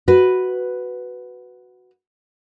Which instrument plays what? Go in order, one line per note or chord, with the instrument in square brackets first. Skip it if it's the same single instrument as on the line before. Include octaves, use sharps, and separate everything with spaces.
[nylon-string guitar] F#4 B4